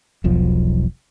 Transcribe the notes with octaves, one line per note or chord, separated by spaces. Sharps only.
E1 B1 F3